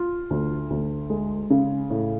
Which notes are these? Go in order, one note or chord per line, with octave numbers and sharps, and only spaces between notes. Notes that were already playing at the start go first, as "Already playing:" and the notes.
Already playing: F4
D2
D2
G#3
C#3
A2